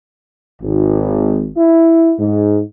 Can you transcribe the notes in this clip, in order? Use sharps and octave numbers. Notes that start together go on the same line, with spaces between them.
G#1
E4
G#2